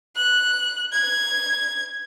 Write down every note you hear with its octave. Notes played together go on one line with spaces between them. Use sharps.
F#6
G#6